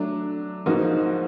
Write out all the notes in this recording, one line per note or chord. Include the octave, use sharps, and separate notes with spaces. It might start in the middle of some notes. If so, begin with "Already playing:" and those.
Already playing: F#3 A3 D4
G#2 F3 A#3 D#4 F#4